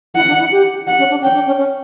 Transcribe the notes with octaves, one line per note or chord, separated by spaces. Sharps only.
E4 F#5
D4
E4
G4
F#5
C#4
D4
C#4 G5
D4
C#4
C#4